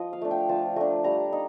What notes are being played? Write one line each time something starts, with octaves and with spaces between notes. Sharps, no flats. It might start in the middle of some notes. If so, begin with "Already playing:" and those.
Already playing: F3 D#5
F5
A3 D4
G5
F3 A5
A3 D4 A#5
G3 A#5
D#4